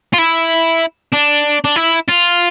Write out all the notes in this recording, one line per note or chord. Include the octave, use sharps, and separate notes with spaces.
F4
E4
D4
D4
E4
F4